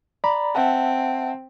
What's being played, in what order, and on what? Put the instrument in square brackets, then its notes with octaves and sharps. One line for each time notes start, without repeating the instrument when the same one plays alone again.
[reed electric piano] D5 A#5 B5
[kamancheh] C4 [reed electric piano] E5 F#5 A5